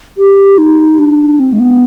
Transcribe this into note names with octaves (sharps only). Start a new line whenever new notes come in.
G4
D#4
D4
C4
G#3
B3